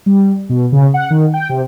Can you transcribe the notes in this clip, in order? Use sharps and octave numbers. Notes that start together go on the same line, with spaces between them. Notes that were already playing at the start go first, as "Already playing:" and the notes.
G3
B2
C#3
F#5
D#3
G5
C3